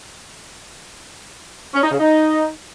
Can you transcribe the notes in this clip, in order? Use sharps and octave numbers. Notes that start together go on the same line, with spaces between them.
C#4
D#4
C#3
D#4